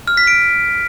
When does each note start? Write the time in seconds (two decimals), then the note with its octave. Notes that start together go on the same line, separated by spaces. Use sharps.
0.08 F6
0.17 B6
0.27 D7